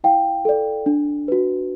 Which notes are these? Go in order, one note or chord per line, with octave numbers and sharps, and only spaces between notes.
E4 F5 G5
A4 D5
D4
F#4 B4